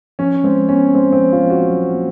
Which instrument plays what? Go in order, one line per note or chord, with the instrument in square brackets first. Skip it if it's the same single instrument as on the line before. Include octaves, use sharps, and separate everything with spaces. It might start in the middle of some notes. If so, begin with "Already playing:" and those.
[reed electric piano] F3 [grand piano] C#4
[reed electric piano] G#3 [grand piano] C4
[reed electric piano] B3 [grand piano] C#4
[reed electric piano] G#3 [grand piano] C4
[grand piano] C4
[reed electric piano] F3
[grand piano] F4
[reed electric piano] F3
[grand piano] F#4
[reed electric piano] F#3
A#3